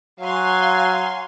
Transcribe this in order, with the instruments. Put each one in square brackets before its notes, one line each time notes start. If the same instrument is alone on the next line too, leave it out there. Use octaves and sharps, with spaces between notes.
[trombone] F#3 [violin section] F5 G#5 C6